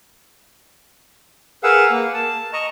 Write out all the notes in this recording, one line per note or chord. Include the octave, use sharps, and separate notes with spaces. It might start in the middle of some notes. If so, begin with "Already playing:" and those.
G#4 A#4 B4 F5 F#5 E6
A#3
A5
D#5 A#5 C#6